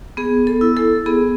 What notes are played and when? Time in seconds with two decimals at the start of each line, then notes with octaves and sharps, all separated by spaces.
0.17 B3 G#4
0.47 A4
0.61 E4
0.77 A4
1.06 B3 G#4